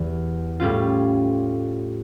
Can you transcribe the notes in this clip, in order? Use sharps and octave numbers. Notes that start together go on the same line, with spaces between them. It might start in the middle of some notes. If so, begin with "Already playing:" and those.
Already playing: E2 E3 G3 E4
A2 G3 C#4 F4